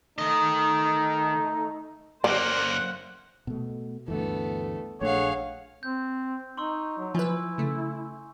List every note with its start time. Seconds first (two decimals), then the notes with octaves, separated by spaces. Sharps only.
0.18 D#3 A3 D#4 D#5
2.24 F#2 A#3 C5 D5 F#5
3.47 B2 A3
4.08 D2 G2 E3 A3 B3
5.01 A#1 A3 D4 G#4 C#5 F5 F#5
5.83 C4 G6
6.57 D#4 C6 C#6 E6
6.98 F#3
7.15 F3 E4 B4 G#5
7.58 C#3 A3